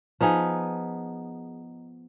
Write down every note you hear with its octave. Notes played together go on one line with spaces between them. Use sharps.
F3 B3 D#4 G#4